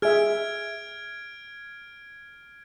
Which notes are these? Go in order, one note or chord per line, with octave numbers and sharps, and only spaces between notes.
G#4 E5 F6 G#6 D7